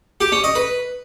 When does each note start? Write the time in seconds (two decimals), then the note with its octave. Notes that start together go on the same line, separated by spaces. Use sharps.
0.21 G4
0.32 C#4
0.44 D#5
0.55 B4